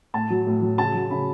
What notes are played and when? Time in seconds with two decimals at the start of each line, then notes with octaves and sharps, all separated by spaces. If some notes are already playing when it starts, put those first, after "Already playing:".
0.14 A2 A5
0.30 F#3
0.47 A2
0.62 F#3
0.78 C#3 A5
0.94 F#3
1.11 C#3 B5